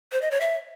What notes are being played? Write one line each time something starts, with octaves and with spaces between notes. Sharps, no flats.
C5
D#5
C#5
E5